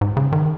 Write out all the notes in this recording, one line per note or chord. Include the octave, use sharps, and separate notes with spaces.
G#2
C#3
D#3